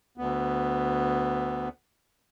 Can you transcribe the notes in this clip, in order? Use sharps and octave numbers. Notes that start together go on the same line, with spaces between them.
D2 B3